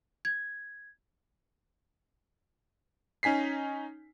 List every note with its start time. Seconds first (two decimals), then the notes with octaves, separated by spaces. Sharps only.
0.25 G#6
3.23 C#4 D#4 G#5 B6 C7